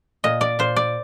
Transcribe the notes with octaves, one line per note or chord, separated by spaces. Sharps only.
A#2 D#5
D5
A#2 C5
D5